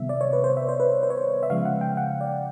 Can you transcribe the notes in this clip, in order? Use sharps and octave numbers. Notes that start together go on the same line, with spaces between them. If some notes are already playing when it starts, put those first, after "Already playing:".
Already playing: C3 D#3 G3 B3 E5
D5
C#5
B4
C5
E5
C5
B4
C5
C#5
C5
E5
C#3 F3 G#3 F5
F#5
G5
F#5
D5